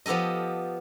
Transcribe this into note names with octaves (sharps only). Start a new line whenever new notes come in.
F3 B3 G4 A4 D#5